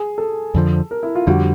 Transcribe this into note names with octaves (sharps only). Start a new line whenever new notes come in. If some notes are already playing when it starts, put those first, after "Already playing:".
Already playing: G#4
A4
F2 D3 F3
A#4
E4
F4
F2 D3 G3 F#4